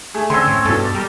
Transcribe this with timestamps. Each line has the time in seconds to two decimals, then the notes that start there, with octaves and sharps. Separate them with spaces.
0.14 A3 G#4
0.30 D3 C4 C#4 C#5 C6 E6
0.47 A2
0.65 G2 B2 A4
0.80 G4
0.95 G3 A#4 G5